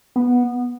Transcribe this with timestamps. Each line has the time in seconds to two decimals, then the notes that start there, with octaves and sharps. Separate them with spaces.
0.16 B3